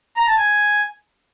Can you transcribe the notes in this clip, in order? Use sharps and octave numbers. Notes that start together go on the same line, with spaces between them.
A#5
A5
G#5